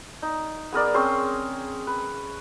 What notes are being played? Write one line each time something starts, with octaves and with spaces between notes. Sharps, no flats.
D#4
B3 G#4 A#4 D5
C4 C#4 G#4 C6
B4